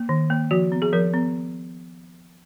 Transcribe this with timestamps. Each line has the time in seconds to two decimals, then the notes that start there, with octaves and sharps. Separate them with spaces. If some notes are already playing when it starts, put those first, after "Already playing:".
Already playing: A#3
0.09 D#3
0.30 A#3
0.51 F3 F#4
0.72 B3
0.82 G#4
0.93 F3 A#4
1.14 B3